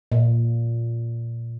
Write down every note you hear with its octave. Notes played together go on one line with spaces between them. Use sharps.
A#2